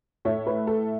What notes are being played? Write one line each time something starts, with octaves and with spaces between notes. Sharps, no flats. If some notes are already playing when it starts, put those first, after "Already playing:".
A2 A3 C#5
B4
A4